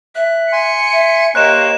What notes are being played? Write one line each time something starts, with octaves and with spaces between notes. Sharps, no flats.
E5 F#6
G#5 C6 C#7
E5
A#3 G4 C5 C#5 D#5 F#6 E7